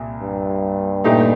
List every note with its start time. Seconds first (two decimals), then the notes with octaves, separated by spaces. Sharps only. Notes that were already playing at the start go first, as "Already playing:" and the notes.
Already playing: C2 A#2
0.21 G2
1.04 A#2 A3 D#4 G4